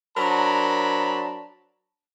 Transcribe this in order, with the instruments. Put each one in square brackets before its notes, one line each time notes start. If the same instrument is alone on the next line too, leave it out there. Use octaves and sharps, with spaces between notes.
[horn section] F#3 D4 A#4 C5 A5 B5